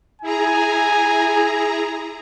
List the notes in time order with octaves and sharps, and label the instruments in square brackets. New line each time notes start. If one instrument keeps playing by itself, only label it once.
[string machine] E4 G#4 A#5 [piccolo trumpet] G#5